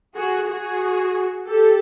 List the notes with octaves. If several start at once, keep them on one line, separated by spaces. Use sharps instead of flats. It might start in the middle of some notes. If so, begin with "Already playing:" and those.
F#4 G#4
F#4 G#4
G4 A4